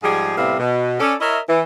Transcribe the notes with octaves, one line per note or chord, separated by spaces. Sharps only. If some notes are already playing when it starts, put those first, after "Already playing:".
G#2 F3 G3 G#4
A2 C3 G3 B3 E5 F5
B2
C#4 A4 D5
E4 A#4 C#5 D#5 E5
E3